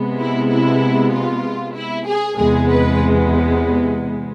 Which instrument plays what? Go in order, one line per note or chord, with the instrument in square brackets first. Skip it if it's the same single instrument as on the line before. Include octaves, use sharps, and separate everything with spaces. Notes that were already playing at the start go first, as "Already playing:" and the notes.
Already playing: [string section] C3 G#3 B3
E4
E4
F4
E4
G#4
E2 C3 G#3 B3 G#4
B4